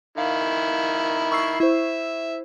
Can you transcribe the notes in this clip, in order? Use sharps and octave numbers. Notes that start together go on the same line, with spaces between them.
D#3 E4 F5
C#6 E6 C7
E4 C5 E5